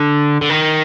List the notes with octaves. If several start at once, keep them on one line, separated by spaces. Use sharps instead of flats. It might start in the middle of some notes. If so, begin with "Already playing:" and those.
Already playing: D3
D3
D#3